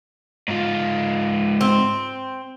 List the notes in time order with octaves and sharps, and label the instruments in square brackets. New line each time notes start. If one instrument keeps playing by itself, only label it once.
[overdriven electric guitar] G#2 F4
[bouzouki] C4